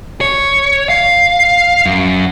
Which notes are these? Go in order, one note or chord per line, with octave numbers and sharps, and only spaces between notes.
C#5
F5
F#2